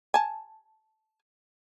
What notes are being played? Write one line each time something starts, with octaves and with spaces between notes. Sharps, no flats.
G#5 A5